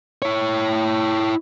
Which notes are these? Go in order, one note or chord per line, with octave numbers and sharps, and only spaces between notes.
E4 C#5